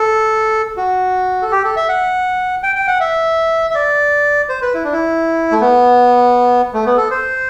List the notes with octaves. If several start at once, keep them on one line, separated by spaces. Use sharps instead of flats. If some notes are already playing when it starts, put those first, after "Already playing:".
Already playing: A4
F#4
A4
G4
A4
E5
F#5
G5
G5
F#5
E5
E5
D5
C5
B4
E4
D4
E4
A3
B3
A3
B3
A4
C5